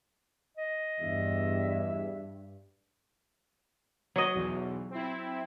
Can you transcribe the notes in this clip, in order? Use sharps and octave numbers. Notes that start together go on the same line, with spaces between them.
D#5
E2 G2 E5
F#3 D#5
B1 E2
C4 E4